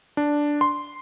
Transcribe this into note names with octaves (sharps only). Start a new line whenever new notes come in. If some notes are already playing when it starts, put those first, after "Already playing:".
D4
C6